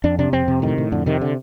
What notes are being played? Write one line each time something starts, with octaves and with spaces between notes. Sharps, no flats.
F2 D4
C3 D4
F2 C4
C3
A2 D#3
A2
F2 D3
C3 D#3
D3